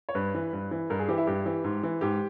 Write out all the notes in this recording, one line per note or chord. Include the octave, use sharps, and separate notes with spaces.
C#5
G2 B4
E3
G2
E3
G2 A#4
G#4
E3 G4
E4
G2 G4
E3
G#2
E3
G#2 G4